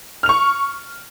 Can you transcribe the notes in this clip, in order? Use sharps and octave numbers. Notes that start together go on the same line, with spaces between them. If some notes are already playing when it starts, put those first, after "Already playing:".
C#6 F6 F7